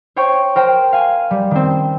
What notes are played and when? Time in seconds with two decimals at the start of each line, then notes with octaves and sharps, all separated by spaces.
0.16 C5 C#5 G5 C#6 G6
0.56 A#4 C5 G5
0.92 F5 G#5
1.31 G3
1.51 D#3 C4